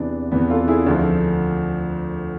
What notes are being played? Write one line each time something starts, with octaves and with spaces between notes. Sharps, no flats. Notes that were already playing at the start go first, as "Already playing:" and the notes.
Already playing: E2 C3 E3 B3 D4
E2 C3 E3 B3
F4 A4
E4 G#4
D2 D3 F3